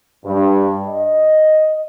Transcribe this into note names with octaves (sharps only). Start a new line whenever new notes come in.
G2
D#5